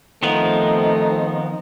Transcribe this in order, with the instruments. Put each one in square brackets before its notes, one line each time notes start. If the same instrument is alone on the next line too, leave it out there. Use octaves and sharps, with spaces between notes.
[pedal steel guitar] D#3 F3 B3 [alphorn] A3 [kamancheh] C4 D#4